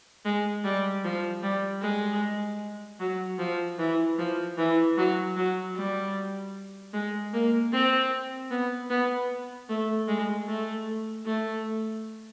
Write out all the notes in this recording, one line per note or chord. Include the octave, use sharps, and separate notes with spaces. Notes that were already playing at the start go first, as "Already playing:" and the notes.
G#3
G3
F3
G3
G#3
F#3
F3
E3
F3
E3
F#3
F#3
G3
G#3
A#3
C4
B3
B3
A3
G#3
A3
A3